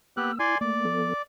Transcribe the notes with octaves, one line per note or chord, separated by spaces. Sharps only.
A#3 B3 G4 E6 F#6
E4 D5 G#5 C6
A3 A#3 D5
F3 B3 A4